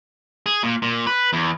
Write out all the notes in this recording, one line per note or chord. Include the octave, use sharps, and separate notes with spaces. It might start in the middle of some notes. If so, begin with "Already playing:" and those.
G#4
A#2
A#2
B4
E2